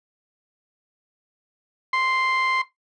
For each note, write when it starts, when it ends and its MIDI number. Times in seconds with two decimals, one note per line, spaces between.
1.93 2.61 84